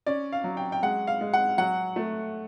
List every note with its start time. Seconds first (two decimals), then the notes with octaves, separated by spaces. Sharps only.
0.06 C#4 D5
0.32 F5
0.44 F#3
0.57 G5
0.72 G5
0.83 G#3 F#5
1.07 F5
1.21 G#3
1.34 F#5
1.58 F#3 F#5
1.96 A3